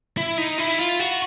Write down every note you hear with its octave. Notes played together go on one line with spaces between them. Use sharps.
E4
D#4
E4
F4
F#4